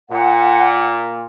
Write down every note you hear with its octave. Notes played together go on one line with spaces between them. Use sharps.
A#2 F#5